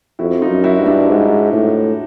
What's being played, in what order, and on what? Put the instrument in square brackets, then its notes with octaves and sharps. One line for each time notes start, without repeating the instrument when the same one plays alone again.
[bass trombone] F2 [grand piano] E4 F#4
[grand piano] D#4 F4
[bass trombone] F#2
[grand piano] E4 F#4
[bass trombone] G2
[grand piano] D4 E4
[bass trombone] G#2
A2